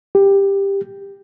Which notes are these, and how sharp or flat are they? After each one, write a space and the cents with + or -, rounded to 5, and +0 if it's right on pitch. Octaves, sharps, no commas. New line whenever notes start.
G4 +10